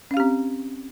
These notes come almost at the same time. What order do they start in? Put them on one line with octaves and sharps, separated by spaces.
C#4 F5 G4 C4